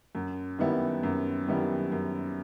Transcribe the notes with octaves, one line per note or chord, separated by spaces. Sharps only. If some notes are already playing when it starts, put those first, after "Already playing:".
F#2
D#3 G3 B3 E4
F#2
D#3 G3 B3 E4
F#2